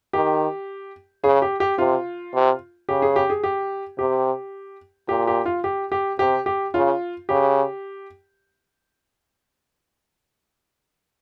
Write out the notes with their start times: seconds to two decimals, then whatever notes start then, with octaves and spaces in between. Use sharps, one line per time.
0.13 D#3 G4
1.23 C#3 G#4
1.42 G4
1.60 G4
1.78 C3 F4
2.34 C3
2.89 C#3 G4
3.02 G#4
3.16 G4
3.30 G#4
3.44 G4
3.99 C3 G4
5.09 A#2 G4
5.27 G4
5.46 F4
5.64 G4
5.92 G4
6.19 C3 G4
6.46 G4
6.74 C#3 F4
7.29 C#3 G4